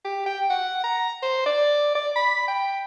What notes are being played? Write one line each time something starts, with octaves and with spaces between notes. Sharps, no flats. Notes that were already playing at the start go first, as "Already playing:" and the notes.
G4
G5
F#5
A#5
C5
D5
D5
B5
G5